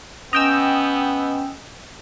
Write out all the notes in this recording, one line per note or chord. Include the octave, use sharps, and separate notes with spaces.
B3 C#4 D#5 G5 G#5 E6